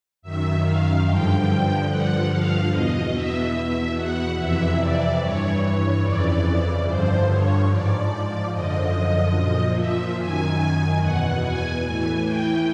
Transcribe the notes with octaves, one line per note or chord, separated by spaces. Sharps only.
F#2 D#3 E5
F5
G2 D3 F3 G5
G2 D3 F3 F#5
F5
E2 B2 D#5
E5
E2 B2 E5
F#5
F2 C3 E3 E5
D5
G2 E3 C#5
C#5
F2 C#3 E3 D5
G2 D3 F3 C5
C#5
G#2 F3 D5
F#2 D3 F3 D#5
A#2 F3
E5
F#2 D#3 G#5
E2 B2 F#5
G#5
A2 E3 G#5
G5